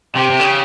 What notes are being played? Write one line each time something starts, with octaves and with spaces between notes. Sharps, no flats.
C3 G4
C3
D3
C#3